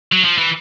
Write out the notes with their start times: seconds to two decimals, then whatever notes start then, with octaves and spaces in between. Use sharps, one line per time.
0.12 F#3
0.24 F3
0.38 E3